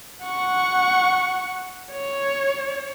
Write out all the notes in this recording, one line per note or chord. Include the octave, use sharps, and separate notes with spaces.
F#5 C#6
C#5